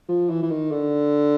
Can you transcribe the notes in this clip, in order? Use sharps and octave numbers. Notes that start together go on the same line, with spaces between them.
F3
E3
E3
D#3
D3